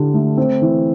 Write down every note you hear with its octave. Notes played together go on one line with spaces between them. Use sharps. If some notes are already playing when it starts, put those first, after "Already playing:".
Already playing: D3 E4 G4
A3
C4
E3